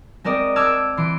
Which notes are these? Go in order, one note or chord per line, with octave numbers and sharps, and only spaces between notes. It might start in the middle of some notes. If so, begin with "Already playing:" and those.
G#3 C4 A#4 D5 D#5
A5 D6 E6 F6 G#6
E3 C6 D7